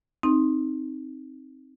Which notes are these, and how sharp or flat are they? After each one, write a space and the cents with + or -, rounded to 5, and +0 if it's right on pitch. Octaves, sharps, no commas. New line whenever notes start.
C4 +10 D#4 +0